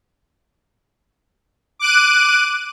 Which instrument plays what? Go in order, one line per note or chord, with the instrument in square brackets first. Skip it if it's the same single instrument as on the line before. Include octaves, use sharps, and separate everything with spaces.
[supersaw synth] D6 F#6 D#7